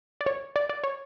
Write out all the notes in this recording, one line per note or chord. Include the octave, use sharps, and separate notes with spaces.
D5
C#5
D5
D5
C#5